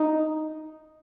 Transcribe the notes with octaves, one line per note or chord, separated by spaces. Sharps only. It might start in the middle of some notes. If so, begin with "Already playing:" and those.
Already playing: D#4